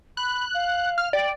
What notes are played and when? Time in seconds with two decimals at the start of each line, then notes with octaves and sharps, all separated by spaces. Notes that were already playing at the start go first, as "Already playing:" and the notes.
0.17 B5 F#6
0.54 F5
0.98 F6
1.13 D5 G5